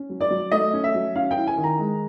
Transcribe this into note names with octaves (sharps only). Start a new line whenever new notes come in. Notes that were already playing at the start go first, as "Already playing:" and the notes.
Already playing: C#4
F#3
D5
F#3
A3 D#5
C#4
E5
F#3
C#4 F5
G5
E4
G#5
D#3
A#5
G#3